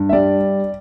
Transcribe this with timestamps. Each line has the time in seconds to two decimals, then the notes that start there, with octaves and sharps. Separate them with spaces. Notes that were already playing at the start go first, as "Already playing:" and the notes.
Already playing: G2
0.09 E5
0.13 G3 D5